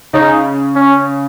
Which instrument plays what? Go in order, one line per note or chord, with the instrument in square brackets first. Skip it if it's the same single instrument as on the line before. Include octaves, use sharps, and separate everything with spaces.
[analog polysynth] C#3 [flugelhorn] D#4
[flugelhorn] C#4